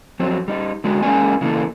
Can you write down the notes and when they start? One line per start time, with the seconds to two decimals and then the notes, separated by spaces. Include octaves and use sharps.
0.19 F2 F#3 C4
0.48 G3 D#4
0.84 D3 G#3 F#4
1.02 G#3 A#3 C#4 C5 D5 G#5
1.41 C#3 E3 F3 A#3 A4